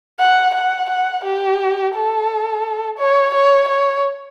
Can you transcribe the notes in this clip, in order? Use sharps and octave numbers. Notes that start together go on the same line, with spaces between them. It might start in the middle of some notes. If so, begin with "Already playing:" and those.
F#5
F#5
F#5
G4
A4
C#5
C#5
C#5